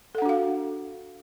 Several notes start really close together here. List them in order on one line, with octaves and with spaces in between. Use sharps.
A4 F#5 D4 F#4 F5